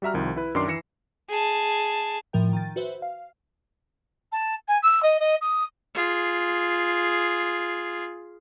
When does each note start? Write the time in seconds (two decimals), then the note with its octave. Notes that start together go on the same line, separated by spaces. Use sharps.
0.02 G3 F#4 E5 A#5 F6
0.14 C2 D#3 F3
0.36 E4 B4
0.55 F#2 D#3 D4 C6 D6 C7
0.68 E3 A#6 C#7 E7
1.29 G#4 A5
2.33 A2 F3 A#4 G5
2.53 D#3 G5 A6
2.76 F#4 B4 C5 E5
3.02 F5
4.31 A5
4.67 G#5
4.82 E6
5.02 D#5
5.19 D#5
5.41 D#6
5.94 F4 G#4